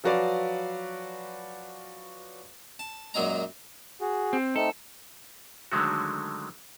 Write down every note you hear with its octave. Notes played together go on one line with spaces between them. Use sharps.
F3 F#3 F#4 B4 D5 F5
A5
F#2 A#2 F#3 G#3 A#5
F#4 G#4
C4
A3 C4 D#4 A4
D3 D#3 F#3 G#3 A3 F#4